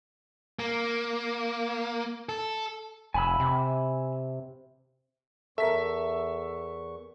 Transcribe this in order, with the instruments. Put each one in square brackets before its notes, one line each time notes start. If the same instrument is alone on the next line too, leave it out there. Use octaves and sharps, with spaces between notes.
[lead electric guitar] A#3
A4
[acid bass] F1 [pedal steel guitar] G#5 B5 E6
[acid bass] C3
[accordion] E2 C#6 [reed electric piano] A4 A#4 [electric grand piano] E5 B6